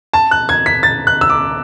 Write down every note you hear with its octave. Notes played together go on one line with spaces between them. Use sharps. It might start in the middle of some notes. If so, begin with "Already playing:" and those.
A5
F#6
G#6
B6
A6
F#6
E6
D6